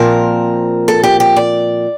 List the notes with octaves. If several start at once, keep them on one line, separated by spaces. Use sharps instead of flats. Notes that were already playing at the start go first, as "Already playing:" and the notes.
Already playing: A#2 F3 C4 A#4
A4
G4
G4
D5